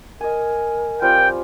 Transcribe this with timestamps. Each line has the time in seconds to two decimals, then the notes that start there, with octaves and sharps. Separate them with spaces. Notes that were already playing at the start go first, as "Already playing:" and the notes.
0.21 A#4 D#5 G#5
1.02 G3 C4 F4 G5